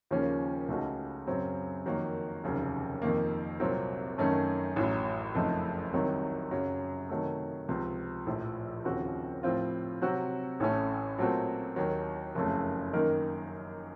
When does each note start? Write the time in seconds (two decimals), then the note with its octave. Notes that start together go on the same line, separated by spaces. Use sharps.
0.11 D#2 C#3 F3 A#3 C#4
0.68 C#2 C#3 A3 D#4 F#4
1.27 F#2 C#3 F#3 C4
1.86 F2 D#3 F#3 A#3
2.44 F1 D#2 C#3 F#3
3.02 F2 D#3 A#3
3.60 C2 A#2 F#3 C4
4.18 F#2 D#3 A3 C#4
4.76 A1 A2 F#3
5.35 F#1 F2 C#3 A3 D#4
5.93 C2 C3 D#3 F#3
6.51 F#2 C#3 F#3
7.09 C3 D#3 F#3 A3
7.68 C#2 C3 F3
8.26 A#1 A2 F3
8.85 D#2 C#3 F3 C4 F#4
9.43 A2 F3 C4 F4
10.01 C3 F#3 C4 F#4
10.60 A1 A2 A3 C#4
11.18 A#2 F#3 A3 C4 F#4
11.76 D#2 D#3 F#3
12.35 F#1 F2 C#3 A3
12.93 F#2 D#3 A#3 D#4 A#4